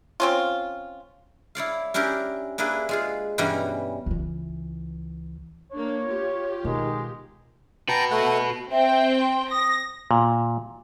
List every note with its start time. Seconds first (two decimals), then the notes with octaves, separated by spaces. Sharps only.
0.20 C4 C#4 F4
1.55 E4 C#5 D5 F5
1.94 C#4 D4 E4 G4 A#4
2.58 A#3 D4 E4 G#4 B4
2.89 G#3 F4 G#4
3.38 G2 B2 E3 G3 C#4 A#5
4.06 C#2 E3
5.72 A#3 D4 C#5
6.06 F4 G4
6.65 B2 D#3 G#3
7.89 F#4 B4 G5 A5 A#5
8.11 A3 F#5
8.71 C4 E5 G5
9.20 C6
9.51 D#6 A#6
10.11 A#2